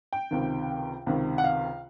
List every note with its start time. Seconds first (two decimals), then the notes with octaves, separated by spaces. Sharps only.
0.13 G5
0.31 C#2 C3 D#3
1.06 C#2 C3 D#3
1.38 F#5
1.44 F5